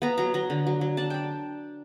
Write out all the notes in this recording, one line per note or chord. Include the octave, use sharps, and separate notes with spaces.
B3 A#5
F#3 A#5
F#3 A#5
D3
F#3
F#3
D4 A5
D4 G5